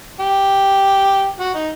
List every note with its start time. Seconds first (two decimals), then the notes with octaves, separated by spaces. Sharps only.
0.20 G4
1.40 F#4
1.55 D#4